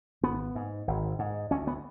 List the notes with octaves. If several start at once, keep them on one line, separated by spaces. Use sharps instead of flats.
G#1 B3
G#2
G#1
G#2
D2 C#4
B3